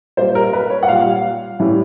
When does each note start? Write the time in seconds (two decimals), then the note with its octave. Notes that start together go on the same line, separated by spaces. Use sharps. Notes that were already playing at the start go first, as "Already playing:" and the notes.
0.17 A#2 G3 C5
0.35 A#4
0.53 B4
0.70 C#5
0.83 F#5
0.88 A#2 G3 F5
1.60 A2 E3 G3